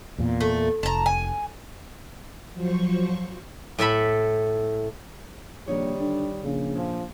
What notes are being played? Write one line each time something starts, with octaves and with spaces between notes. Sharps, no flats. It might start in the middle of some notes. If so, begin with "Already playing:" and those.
E2 A#2
A3
F1 A5 A#5
G#5
F3 F#3 C5 C#6
A2 A4 E5 B5
A#1 D#3 G3 D#4 C#5
D3
A#1 C#3
A#2 F3